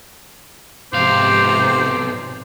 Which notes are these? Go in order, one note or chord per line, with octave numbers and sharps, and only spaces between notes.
B1 G#2 C3 F3 C5 F5 D6